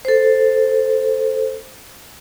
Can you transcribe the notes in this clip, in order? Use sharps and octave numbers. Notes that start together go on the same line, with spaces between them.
A4 C5